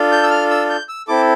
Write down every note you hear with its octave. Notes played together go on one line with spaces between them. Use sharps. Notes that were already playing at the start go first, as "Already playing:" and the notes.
Already playing: D4 F4 A4
G6
E6
F6
E6
G6
E6
C4 E4 A4 D6